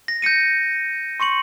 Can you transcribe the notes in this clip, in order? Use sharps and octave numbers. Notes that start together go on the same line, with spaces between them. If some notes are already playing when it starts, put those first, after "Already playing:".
A#6
G6 A#6 C#7 D#7
C6 C#6 C#7 F#7